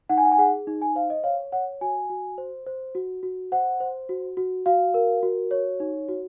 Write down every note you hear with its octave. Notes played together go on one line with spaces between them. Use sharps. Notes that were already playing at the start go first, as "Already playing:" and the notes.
D#4 F#5
G#5
F#5
G#5
G#4 F#5
D#4
G#5
C5 F5
D#5
C#5 F5
C#5 F#5
F#4 G#5
F#4
C5
C5
F#4
F#4
C5 F#5
C5
F#4
F#4
F#4 F5
A#4
F#4
C#5
D#4
F#4